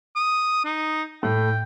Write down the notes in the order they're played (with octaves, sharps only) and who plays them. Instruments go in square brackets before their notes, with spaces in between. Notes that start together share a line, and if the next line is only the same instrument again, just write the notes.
[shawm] D#6
D#4
[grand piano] A2 A3 [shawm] G5